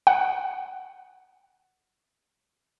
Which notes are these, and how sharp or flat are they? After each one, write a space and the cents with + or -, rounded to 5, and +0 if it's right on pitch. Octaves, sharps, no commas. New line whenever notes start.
F#5 +10